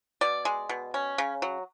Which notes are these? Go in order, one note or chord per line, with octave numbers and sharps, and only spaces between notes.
B2 D5
G#3
B2
C#4
C#3
F#3